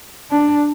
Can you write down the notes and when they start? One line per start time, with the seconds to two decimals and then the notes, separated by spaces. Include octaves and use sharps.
0.31 D4